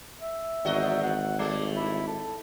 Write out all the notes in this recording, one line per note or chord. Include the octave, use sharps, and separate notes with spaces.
E5
G#1 E2 F#4 D#5
F#5
G3 A3 D5
E4
A4